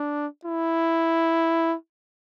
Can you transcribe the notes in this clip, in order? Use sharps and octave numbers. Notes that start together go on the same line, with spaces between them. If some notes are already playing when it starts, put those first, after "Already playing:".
Already playing: D4
E4